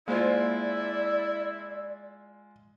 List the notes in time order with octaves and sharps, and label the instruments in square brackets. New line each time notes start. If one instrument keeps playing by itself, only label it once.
[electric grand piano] G#3 F4 [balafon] A#3 C5 [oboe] E4 [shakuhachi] D5